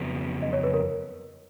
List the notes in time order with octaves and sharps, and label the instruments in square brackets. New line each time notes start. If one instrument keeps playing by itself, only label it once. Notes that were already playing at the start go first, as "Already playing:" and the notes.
Already playing: [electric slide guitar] F2 C#3 F#3 B3
[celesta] D#5
C#5
B4
A#4